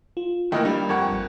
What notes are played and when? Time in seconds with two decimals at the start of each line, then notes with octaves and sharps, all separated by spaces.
0.17 F4
0.52 D#3 E3 A3 A#3 E4 D#5 G5 F6
0.65 G2 G3 A#3 D4
0.89 F2 A#4 F#5 G5 C#6 G#6
1.11 G#1